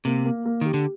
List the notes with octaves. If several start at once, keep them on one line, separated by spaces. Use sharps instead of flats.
C3 A#3
A#3
A#3
D#3 G4
D3